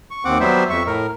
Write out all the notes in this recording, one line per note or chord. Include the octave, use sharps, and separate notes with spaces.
C#6
D#2 C4 F#5 D6
F#3 G3 B3 C5 E5
F2 E5 C#6
A2 A#4